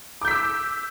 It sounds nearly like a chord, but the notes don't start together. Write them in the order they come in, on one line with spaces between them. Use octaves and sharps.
D6 G6 B6 E6